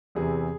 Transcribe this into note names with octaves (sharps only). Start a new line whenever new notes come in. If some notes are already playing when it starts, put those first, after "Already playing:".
E2 C3 E3 G#4